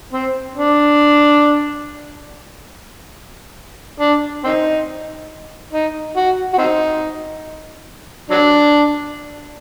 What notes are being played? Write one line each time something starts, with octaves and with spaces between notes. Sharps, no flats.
C4
D4
D4
C4 D#4
D#4
F#4
F#4
C4 D#4
F#3 D4